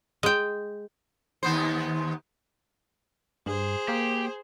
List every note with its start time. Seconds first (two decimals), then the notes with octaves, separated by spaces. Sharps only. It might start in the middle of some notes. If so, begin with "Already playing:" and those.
0.23 G#3 G5
1.43 D#2 B3 C5
3.46 G2 G#4 C5
3.88 A#3 G4